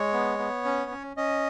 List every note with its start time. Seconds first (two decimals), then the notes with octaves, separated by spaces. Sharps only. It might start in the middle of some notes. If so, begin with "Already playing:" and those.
Already playing: G#3 C#5
0.13 B3
0.39 B3
0.65 C#4
0.91 C#4
1.17 C#4 D#5